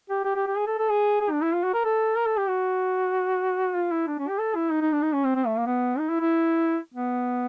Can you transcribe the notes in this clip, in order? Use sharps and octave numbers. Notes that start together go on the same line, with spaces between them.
G4
G4
G4
G4
G#4
A4
A4
G#4
G#4
D4
E4
F4
F#4
A#4
A4
A#4
A4
G4
F#4
F4
E4
D4
C#4
G4
A4
E4
D#4
D#4
D4
D#4
C#4
C4
C4
A3
A#3
B3
D#4
E4
E4
B3